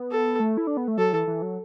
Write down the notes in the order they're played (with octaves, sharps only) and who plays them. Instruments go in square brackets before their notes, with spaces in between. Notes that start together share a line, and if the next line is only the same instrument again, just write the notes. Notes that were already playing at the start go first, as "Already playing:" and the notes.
Already playing: [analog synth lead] B3
[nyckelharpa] A4
[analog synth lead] A3
E4
D4
B3
A3
[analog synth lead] F#3 [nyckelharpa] A4
[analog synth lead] E3
E3
F#3